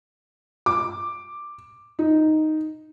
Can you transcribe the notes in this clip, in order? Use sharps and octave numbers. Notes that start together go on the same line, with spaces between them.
D6
D#4